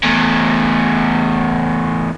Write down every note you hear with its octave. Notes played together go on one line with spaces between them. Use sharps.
E2 A2